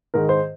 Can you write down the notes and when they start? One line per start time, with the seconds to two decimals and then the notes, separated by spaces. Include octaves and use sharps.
0.14 G#2 D#3 A#4
0.29 C5